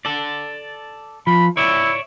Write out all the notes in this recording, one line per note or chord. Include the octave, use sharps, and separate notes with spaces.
A4 D5
F3 B5
E4 C#5 D5 E5